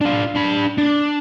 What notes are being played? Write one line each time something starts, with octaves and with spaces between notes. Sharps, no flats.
D4 F4
D4 B5
D4